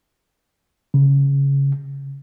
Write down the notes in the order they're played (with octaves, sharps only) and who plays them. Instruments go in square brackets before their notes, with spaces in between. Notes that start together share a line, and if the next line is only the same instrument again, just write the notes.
[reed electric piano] C#3